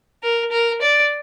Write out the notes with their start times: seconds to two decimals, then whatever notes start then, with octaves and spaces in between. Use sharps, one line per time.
0.23 A#4
0.52 A#4
0.81 D5